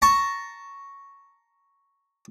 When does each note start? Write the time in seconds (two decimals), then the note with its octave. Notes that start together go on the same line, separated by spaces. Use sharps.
0.02 A5 A#5 C#6